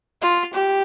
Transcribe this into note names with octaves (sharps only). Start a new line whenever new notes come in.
F4
G4